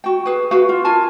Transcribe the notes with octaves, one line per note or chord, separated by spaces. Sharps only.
F#4 G5
G#4 B4
F#4 B4 F5
F4
F4 A#4 G#5 A5